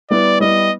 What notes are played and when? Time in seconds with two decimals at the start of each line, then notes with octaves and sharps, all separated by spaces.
0.10 G3 B3 E4 D5
0.41 G3 B3 E4 D#5